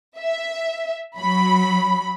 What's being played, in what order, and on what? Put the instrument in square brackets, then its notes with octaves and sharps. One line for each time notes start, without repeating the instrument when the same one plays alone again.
[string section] E5
F#3 B5